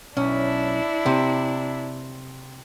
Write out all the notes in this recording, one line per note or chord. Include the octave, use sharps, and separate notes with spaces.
B1 C#4 D4 E4
C3